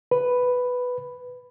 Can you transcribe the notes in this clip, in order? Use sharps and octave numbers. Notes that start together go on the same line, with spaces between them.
B4